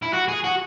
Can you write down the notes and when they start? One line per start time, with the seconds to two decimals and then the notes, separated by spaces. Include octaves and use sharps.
0.02 E4
0.13 F#4
0.28 G#4
0.44 F#4